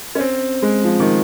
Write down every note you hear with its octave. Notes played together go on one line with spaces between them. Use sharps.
C#4
C4
G#3
F3
D#3